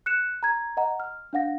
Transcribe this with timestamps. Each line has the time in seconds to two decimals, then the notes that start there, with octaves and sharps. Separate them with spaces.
0.06 F#6 C#7 E7
0.43 A#5 G#6
0.77 D#5 F#5 A#5
1.00 F6
1.33 D4 F5 F#5 A#6